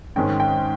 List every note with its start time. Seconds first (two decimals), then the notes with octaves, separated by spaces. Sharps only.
0.16 G#2 D#3 G#3 C#4 G5
0.40 G5